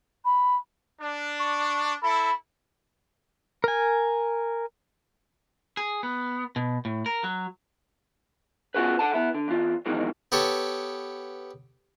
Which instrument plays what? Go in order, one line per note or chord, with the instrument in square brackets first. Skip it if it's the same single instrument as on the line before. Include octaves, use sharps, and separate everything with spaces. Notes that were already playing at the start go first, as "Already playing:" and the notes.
[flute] B5
[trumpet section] D4
[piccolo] C#6
[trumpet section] E4 A4 [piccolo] B5
[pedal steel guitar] A#4 G#5
[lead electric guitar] G#4
B3
B2
A2
A#4
F#3
[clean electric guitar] B3 C#4 F4 F#4 G#4 B4
A4 F#5 A5
B3 E4
D3
E2 F4
F2 B2 D#3 E3 G#3
[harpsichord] B3 G4 A4 C#5